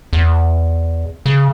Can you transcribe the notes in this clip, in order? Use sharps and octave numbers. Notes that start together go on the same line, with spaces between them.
E2
C#3